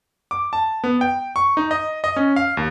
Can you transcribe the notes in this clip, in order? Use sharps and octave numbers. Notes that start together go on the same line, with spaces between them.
D6
A5
B3
G5
C#6
D#4
D#5
D#5
C#4
F5
D#2